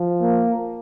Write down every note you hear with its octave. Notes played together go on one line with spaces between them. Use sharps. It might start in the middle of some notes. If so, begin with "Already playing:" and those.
Already playing: F3
A#3